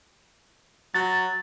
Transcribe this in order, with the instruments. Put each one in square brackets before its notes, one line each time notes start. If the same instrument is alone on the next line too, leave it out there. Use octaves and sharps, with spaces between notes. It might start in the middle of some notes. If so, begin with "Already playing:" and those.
[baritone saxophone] F#3 [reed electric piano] A6